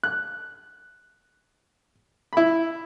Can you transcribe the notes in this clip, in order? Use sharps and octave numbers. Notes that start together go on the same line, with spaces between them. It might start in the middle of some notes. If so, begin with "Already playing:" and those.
F#6
E4 B5